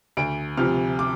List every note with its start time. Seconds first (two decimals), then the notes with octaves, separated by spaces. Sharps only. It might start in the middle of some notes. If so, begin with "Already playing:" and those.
0.17 D2 D7
0.57 C3 F3 F6
0.99 D6